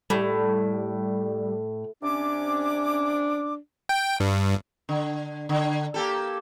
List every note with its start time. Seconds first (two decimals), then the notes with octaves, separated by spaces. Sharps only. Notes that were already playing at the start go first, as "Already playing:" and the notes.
0.10 A2 G3
2.03 C3 C#4 D4 D6
3.89 G5
4.20 G2
4.89 D3
5.49 D3
5.94 A#3 G4 A4